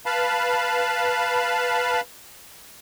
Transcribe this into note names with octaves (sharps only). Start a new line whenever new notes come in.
B4 F5 A5 B5